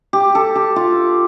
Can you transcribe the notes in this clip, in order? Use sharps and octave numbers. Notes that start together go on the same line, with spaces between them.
G4
A4
G4
F4